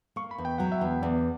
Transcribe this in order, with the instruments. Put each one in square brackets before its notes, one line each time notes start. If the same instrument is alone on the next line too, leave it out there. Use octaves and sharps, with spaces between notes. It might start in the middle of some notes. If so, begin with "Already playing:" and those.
[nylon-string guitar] A#3 [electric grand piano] C#6
[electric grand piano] B5
[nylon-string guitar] E2
[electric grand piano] G5
[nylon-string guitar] F#3 [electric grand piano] F#5
[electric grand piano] E5
[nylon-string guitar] E2 [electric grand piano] F#5
[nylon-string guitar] E2 [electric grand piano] D5